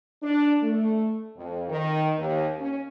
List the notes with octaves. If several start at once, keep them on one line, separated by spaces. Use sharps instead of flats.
D4
A3
F2
D#3
D#2
C#4